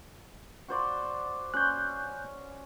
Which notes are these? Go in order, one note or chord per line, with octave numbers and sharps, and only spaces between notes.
F#4 C5 D5
C#4 C6 F#6 G6